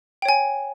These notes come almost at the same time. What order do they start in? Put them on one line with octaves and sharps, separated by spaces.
G5 C#5 G#5